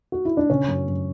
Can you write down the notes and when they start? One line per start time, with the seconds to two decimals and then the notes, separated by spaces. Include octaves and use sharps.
0.12 F#4
0.25 E4
0.37 D4
0.50 C#3 C#4
0.68 F#2
0.87 F#2